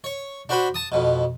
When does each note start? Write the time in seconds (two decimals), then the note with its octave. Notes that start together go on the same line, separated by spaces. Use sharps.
0.04 C#5
0.49 D4 F#4 C5 B5
0.74 A5 D#6
0.92 F2 B2